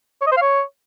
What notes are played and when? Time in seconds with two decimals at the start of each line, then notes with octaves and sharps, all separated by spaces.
0.22 C#5
0.27 D#5
0.32 C5
0.37 F5
0.42 C#5